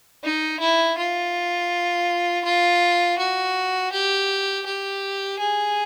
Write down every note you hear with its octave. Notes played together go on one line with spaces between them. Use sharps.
D#4
E4
F4
F4
F#4
G4
G4
G#4